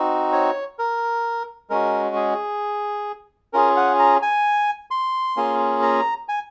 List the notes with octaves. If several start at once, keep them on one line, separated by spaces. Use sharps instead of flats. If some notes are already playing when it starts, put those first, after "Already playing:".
Already playing: C4 D#4 F#4
C#5
A#4
G#3 C#4 F#4 A#4
G#4
C#4 F4 G#4 A#4
F#5
A#5
G#5
C6
A#3 C#4 F4 G#4
A#5
G#5